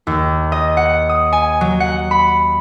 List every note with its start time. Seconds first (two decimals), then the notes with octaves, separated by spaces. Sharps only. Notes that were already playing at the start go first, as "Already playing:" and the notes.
0.07 D#2
0.52 D#5
0.77 F#5
1.09 D#6
1.32 G#5
1.61 F#3
1.80 F#5
2.11 B5